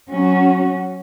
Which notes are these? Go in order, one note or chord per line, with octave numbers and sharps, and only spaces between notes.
F#3 C#4 F#4